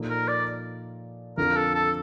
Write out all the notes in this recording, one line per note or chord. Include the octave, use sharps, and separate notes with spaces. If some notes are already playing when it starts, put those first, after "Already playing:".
Already playing: A#2 F3 A#3 D#4 A4
A#4
D5
F2 D3 F3 A#4
A4
A4